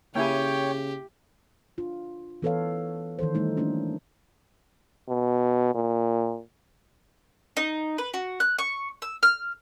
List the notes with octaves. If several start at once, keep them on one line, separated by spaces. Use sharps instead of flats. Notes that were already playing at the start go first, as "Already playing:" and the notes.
C#3 A#3 E4 G4 C#5 G5 G#5
D4 F4
E3 B3 A4 B4 C#5 F5
D#3 E3 A4 C5
G3 A3 D#4
F3 A3 A#3 C#4 D4 F4
B2
A#2
D#4
B4
F#4
F#6
C#6
E6
F6